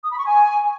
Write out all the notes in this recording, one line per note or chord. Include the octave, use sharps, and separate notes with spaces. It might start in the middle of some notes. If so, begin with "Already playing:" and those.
D#6
B5
C#6
G#5